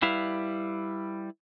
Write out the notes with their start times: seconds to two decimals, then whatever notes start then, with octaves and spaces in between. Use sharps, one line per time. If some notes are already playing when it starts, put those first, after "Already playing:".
0.02 G3 E4 B4 F5